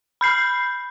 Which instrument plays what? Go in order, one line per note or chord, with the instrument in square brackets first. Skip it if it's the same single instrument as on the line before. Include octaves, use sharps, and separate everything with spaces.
[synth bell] B5 G6 C7